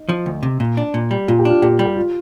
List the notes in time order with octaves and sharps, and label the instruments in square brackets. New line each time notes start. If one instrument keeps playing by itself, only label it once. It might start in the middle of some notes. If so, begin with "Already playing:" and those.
Already playing: [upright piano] D#4
[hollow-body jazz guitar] F3
D2
C3
A#2
D4
A#2
G3
[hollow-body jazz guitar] A#2 [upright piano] F4
[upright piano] G4
[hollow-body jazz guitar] D4 [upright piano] F4
[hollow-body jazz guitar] A#2 [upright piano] G4
[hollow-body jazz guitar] G3
[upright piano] G4
F4